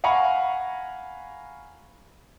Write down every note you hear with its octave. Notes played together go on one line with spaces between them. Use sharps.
F5 F#5 G#5 A#5 B5 C#6